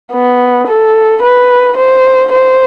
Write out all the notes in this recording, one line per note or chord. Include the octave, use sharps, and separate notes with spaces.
B3
A4
B4
C5
C5